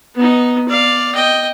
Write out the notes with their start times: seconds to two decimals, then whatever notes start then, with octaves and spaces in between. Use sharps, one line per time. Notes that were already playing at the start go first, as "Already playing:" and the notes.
0.15 B3 D#4
0.69 D5 F5
1.15 D#5 G5